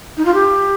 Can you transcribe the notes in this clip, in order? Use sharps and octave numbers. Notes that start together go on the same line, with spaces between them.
D#4
F4
G4